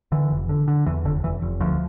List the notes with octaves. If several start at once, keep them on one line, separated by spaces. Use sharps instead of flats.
D3 E3
F1
D3
D3
E2 E3
F1 D3
F1 E3
F1
D2 F3